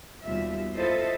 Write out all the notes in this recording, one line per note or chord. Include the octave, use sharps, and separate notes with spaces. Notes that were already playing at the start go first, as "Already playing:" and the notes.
D#2 B2 G3 F4 E5
E4 F4 A4 C5 D#5 E5